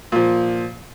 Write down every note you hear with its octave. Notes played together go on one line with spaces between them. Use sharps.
A#2 F3